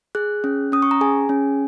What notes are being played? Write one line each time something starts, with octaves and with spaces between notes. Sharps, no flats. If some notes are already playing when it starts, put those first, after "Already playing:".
G#4 F#6
C#4
C#4 D#6
C#6
A#5
G#4 G#5
C#4